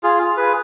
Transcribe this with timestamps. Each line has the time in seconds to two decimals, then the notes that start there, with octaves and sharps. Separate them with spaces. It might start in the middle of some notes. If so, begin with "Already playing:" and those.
0.03 F4 G#4
0.37 G#4 B4